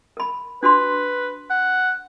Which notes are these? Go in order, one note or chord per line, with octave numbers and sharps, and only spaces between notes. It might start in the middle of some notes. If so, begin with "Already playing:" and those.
A#4 B5
D4 F#4 B4 C6
F#5